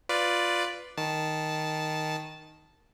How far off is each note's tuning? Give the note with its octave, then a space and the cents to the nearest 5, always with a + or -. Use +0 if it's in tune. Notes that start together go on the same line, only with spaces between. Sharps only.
F4 +5 B4 +5 D5 +0
D#3 +0 A5 -10